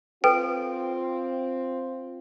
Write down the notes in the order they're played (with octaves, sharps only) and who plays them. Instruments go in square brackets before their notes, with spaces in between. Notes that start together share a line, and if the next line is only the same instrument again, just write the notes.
[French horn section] C4 F4 [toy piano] A4 B4 [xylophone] G5